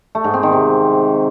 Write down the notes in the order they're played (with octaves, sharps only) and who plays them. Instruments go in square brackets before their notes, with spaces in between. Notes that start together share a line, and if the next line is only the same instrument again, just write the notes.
[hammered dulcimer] A3
G#2
C4
D#3
C3